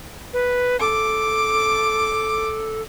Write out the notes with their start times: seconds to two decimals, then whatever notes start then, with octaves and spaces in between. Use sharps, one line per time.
0.33 B4
0.80 A4 D6